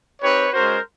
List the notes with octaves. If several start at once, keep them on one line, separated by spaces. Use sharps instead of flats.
C4 D#4 G4 B4 C#5
G#3 C#4 F#4 A#4 C5